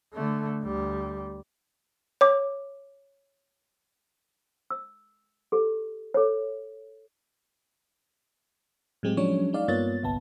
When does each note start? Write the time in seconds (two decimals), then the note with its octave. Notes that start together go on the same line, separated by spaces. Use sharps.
0.14 D3 A3
0.63 D2 G3
2.21 C#5 D6
4.70 E6
5.52 G4 A4
6.14 A4 C#5
9.03 A2 F#3 G#3 C4 G4
9.17 F3 F#3 G#3 C#4 D4 C#5
9.53 G#3 D#4 D5 F5
9.68 G2 A#3 B3 F4 C#5 A6
10.03 G1 C2 B3 A5